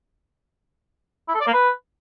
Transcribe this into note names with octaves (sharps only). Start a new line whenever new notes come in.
E4
A4
D5
A#3
B4